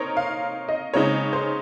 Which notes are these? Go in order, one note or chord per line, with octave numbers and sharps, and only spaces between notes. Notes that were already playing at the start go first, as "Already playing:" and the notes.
Already playing: C4 D#4 A#4 C5 C#5
F5
D#5
C#3 G#3 C4 D#4 C#5
C5